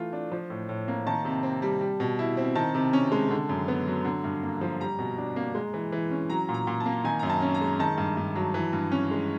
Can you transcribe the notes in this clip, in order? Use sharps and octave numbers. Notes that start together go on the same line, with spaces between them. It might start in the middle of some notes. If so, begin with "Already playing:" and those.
Already playing: E3 A3 F4
D4
F3
A2
A2
A#3
D#3 A5
C3
C4
G3
G3
B2
E4
C4
D#3 A5
C3
C#4
G#3
D3
F#2
B3
F#3
D3
G2
A#3
F3
G3 A#5
B2
D4
A#3
G#3
E3
E3
C#4
F#3 A#5
A#2
A#5
A#2
A5
A#3
D#3 G#5
F#2 A#5
A5
C#4
A#5
G#3
D#3 A5
G2
G2
F#3
E3
G2
C#4
G#3